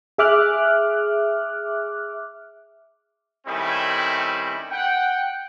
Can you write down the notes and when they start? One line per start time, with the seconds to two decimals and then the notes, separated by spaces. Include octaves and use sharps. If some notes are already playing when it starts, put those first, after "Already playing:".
0.18 G#4 E5 D6 F6 F#6
3.47 D#3 G3 A3 C4 C#4 E4
4.71 F#5 G5